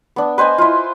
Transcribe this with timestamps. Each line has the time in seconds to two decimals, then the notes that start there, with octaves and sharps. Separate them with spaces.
0.16 B3 D4
0.38 B4 C5 D#5 G#5
0.58 E4 F4